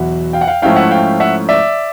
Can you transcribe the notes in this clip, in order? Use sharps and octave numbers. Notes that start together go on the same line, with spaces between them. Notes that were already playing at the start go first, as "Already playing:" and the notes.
Already playing: E2 B2 F#3 E5 F#5
F5 G5
F#5
F5 G5
G#2 F3 A3 C#4 E4 F5 G5
E5 F#5
F5 G5
E5 F#5
D5 E5